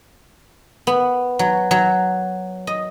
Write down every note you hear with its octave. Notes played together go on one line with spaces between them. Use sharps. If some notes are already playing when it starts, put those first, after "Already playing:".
B3
F#3
F#3
D#5